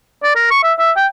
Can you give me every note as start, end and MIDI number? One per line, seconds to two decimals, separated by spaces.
0.23 0.34 74
0.36 0.47 70
0.51 0.63 85
0.63 0.73 76
0.79 0.91 76
0.96 1.07 79